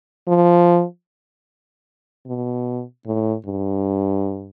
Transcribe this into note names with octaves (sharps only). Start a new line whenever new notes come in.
F3
B2
A2
G2